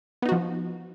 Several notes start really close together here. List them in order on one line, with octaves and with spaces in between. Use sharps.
B3 D#4 F#4 F3